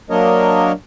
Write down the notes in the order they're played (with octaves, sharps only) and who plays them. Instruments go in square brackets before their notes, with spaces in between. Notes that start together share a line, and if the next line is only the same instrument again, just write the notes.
[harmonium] F#3 A#3 D4 A#4 C#5 D#5